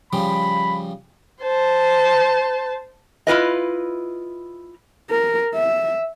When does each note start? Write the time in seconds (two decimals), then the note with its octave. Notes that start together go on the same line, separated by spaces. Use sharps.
0.13 C#3 F3 G3 B5
1.42 C5 A5
3.27 E4 F4 B4 D#5
5.10 A#4
5.54 E5